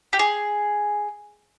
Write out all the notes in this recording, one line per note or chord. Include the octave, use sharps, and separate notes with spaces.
G4
G#4